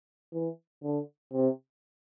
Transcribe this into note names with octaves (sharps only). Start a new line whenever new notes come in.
E3
D3
C3